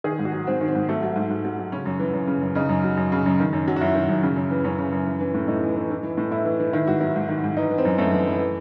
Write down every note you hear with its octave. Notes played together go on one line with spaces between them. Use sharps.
D#3 G#4
G#2
F#4
F#3
G#2 C4
D#3
C4
G#2
F#3 A3
F#3
G#2
G#2
F#3
F#3
C#3 C#4
F#2
E3
F#2
C#3
F#2
C#3 D#4
F#2
F#3
F#2
C#3
F#2
D#3
F#2
F#3
F#4
F#2 E4
D#3
F#2
C#3
F#2
E3
F#2 C#4
C#3
F#2
E3
E3
A2
A2 D#4
E3
E3
E3
E3
A2
A2 E4
E3
E3
D#3 E4
G#2 F#4
F#3 E4
G#2
D#3
G#2
E3 D#4
E3
C4
F#2
F#2 A3
E3
E3
E3